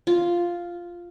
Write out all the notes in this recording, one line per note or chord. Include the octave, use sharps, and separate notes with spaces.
F4